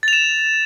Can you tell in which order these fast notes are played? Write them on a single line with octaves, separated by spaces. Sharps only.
A6 F7 E7